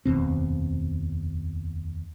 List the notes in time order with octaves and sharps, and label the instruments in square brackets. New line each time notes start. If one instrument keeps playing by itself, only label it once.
[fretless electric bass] F1 D#2 B2 C4